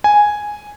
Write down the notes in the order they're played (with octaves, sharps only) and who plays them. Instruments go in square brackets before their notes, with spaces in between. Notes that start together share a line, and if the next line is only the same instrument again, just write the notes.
[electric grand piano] G#5